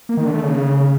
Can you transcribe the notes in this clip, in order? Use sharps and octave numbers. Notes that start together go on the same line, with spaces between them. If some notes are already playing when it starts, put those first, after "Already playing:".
A#3
D#3
D3
A3
C#3